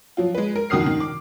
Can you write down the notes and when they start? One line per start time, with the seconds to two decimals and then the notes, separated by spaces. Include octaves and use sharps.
0.17 F3 F#3 F4
0.35 G#3 B4
0.56 A#4
0.70 F2 D#3 F#4 D#6 F6 C7
0.86 D#3
1.00 D6